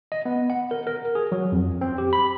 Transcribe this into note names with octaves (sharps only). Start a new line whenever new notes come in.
D#5
B3
F#5
A#4
A#4
G#4
F#3
F2
C4
G4
B5